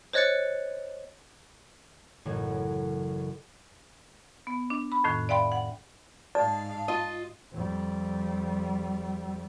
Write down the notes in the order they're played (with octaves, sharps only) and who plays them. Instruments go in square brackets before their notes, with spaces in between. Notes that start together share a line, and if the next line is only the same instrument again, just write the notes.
[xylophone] C5 C#5 D#5 F#6 A6 C#7
[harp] A1 F#2 C#3
[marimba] B3
D4
B5
F2 A2 D#3 F#6
D5 E5 F5 G5 B5 C6
F#5
[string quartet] G#2 F5 [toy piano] D5 [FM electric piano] A5
[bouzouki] F4 D#5
[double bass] F2 G3